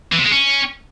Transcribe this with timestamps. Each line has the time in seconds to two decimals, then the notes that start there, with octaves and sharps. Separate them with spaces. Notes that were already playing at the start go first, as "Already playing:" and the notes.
0.12 E3
0.19 C3
0.25 G#3
0.32 C#4